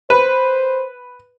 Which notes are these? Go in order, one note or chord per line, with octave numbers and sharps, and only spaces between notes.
B4 C5